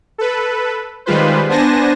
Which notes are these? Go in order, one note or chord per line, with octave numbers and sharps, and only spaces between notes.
A4 B4
D#3 G3 G#3 F4 B4 C5
B3 D4 C5 G#5 A5 A#6